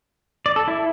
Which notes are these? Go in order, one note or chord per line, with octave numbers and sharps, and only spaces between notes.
D5
A4
E4